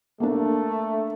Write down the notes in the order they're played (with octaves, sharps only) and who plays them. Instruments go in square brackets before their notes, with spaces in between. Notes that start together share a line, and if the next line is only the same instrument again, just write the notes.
[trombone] A3 [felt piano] A#3 D4